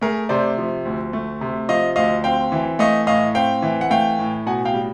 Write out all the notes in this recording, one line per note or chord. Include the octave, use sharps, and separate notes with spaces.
A3 G#4 A#4
C3 C5 D5
F3
D2
A3
C3
F3 D#5 F5
D2 D#5 F5
C4 F5 G5
E3
A3 D#5 F5
A2 D#5 F5
C4 F5 G5
E3
F#5
A3 F5 G5
A2
B2 F#5 G#5
F5 G5
G3